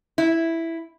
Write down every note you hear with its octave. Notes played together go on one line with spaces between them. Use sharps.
E4